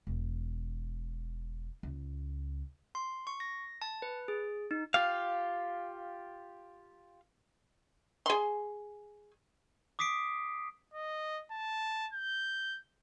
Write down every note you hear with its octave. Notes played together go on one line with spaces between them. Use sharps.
E1
C#2
C6
C#6
A#6
A5
B4
G#4
D#4
F4 G4 F5
G#4 C6
D6 D#6 B6 C7 D7
D#5
A5
G6